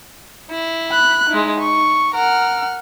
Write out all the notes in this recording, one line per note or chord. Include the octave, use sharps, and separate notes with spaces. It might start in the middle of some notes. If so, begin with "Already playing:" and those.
E4
B5 F#6
G#3 D#4 E4
C#6
A#4 F#5 F6